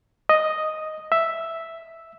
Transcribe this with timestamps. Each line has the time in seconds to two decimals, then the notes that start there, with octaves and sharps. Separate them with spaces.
0.29 D#5
1.12 E5